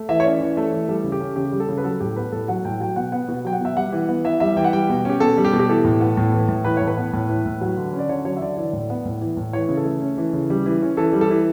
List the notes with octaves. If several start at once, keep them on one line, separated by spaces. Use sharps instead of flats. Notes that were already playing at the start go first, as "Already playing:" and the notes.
Already playing: A3
E3 E5
C#5
C#4 D5
E3
A3
E3
G3 A4
C#3
G4
C#4
C#3 G4
G3
A4
C#3
B4
F#3 A4
A2 G4
B3 B4
A2 A4
F#3 F#5
A2 G5
F#3 G5
B2 F#5
B3 F#5
B2
F#3 G5
F#5
B2 E5
G3 F#5
E3
B3
E3 E5
G3 E5
E3 G5
F#5
G3 G5
B2
C#4 G4
B2 A4
G3
G4
B2
G4
E3 A4
A2
B3
A2
E3
A2
E3 B4
A2 C#5
B4
B3
A2
E3
A2
F#3
D3
C#4
D5
D3 C#5
F#3 C#5
E5
D3 D5
E3 D5
A2
B3
A2
E3
A2
E3 C#5
C#3
A4
A3
C#4
E3
C#3
G3
E3
C#4
E3 A4
G3
A4
E3